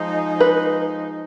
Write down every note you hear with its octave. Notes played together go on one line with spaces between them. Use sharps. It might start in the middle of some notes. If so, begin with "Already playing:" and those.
Already playing: F3 G#3 D#4
B4